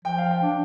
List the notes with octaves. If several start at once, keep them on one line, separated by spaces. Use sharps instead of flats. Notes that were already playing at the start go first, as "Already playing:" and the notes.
F3 G5
F5
G5
D4